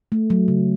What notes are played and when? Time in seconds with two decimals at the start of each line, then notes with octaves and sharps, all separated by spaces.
0.12 A3
0.30 F#3
0.48 C#3